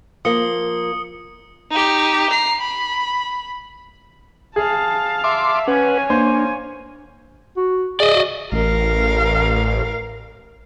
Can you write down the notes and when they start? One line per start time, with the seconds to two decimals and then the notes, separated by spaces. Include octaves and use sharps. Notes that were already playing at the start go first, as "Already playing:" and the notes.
0.25 F3 A#3 D#6 C#7 G7
1.71 D#4 G4
2.30 A#5 C7
2.60 B5
4.56 G#4 F5 A5
5.24 E5 C6 D6
5.68 C#4 B4 C#5 F#5 G#5
6.10 A#3 D4 C5
7.57 F#4
8.00 G#4 D5 D#5
8.14 F#4
8.52 A1 A#4 F5